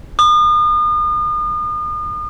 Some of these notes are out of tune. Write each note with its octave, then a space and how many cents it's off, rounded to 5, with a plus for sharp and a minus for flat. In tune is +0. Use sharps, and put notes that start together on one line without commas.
D#6 -40